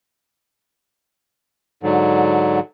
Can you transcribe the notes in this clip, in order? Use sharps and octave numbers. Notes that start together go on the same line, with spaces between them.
G#2 D3 F#3